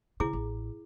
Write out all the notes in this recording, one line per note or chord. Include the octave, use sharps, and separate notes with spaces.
C#3 E4 G#4 D6
A1